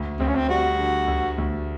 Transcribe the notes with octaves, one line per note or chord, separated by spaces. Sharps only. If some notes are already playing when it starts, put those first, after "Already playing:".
Already playing: D2
D2 C4
C#4
C4
G3 F#4
D3
D2
D2